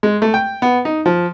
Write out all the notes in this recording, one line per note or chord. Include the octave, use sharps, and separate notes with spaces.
G#3
A3
G5
B3
D#4
F3